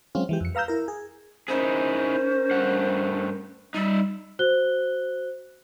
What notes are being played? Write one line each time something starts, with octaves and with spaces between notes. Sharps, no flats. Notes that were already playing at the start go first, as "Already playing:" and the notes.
F#3 G#3 C4 C#4 F4
E3 G#3 G4
F2 C#7
B4 F5 A#5 E6 G6
E4 A#4
G#4
C#4 D#4 E4 G#4 A#4 C5
G2 A3 F#5
G3 D#4 E5
F#4 C5 F#6 G7